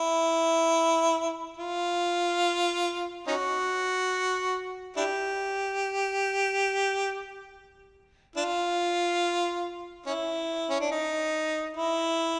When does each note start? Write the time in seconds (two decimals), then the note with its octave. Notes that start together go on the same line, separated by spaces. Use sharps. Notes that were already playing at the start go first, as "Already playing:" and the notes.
Already playing: E4
1.57 F4
3.27 C#4 D#4 F#4
4.96 D4 E4 G4
8.36 D4 F4
10.06 C#4 E4
10.70 C#4
10.80 D4
10.91 D#4
11.76 E4